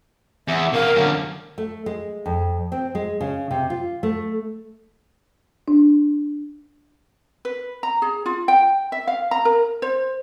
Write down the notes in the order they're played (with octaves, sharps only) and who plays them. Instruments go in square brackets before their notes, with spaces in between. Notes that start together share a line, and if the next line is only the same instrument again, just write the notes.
[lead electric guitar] E2 [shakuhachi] E5
[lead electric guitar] B2 F5 [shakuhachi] A#4
[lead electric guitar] F#2 D3
[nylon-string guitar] A3
G#3
F2
C4
G#3
C#3
C3
F4
A3
[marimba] D4
[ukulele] B4
A#5
G#4
F4
G5
E5
F5
A#5
A#4
C5